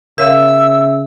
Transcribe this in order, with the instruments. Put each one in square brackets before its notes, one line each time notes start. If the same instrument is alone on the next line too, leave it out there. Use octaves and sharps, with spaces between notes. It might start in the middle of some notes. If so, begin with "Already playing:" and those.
[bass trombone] C#3 [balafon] A#4 C#5 F5 [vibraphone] E5 [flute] E6